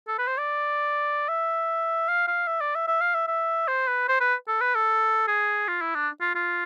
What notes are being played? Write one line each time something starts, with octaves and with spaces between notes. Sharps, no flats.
A4
B4
C5
D5
E5
F5
F5
E5
D5
E5
E5
F5
E5
E5
C5
B4
C5
B4
A4
B4
A4
G#4
F4
E4
D4
F4
F4